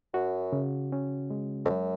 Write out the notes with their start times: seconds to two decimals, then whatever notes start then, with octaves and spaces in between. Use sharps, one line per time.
0.14 F#2 F#4
0.53 C#3
0.92 C#4
1.30 G#3
1.65 F2
1.70 F#2 F#3